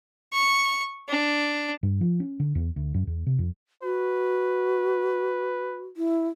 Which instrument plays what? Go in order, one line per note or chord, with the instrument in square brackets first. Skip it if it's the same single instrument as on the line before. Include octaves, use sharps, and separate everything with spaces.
[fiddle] C#6
D4
[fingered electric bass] G2
F3
C#4
D3
E2
D2
F#2
E2
C3
F2
[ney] F#4 [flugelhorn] B4
[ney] E4